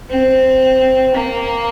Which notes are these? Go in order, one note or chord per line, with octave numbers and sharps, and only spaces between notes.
C4
A#3